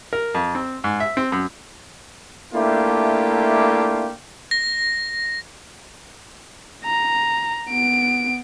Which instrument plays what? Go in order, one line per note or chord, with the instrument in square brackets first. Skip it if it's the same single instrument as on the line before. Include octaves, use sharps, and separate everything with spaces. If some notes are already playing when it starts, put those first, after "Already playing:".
[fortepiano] A#4
F2
C4
G#2
E5
C4
F#2
[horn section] A3 A#3 D4 E4 F4 G4
[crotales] A#6
[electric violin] A#5
B3 D7